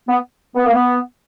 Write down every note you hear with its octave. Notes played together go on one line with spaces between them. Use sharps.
B3
B3
A#3
B3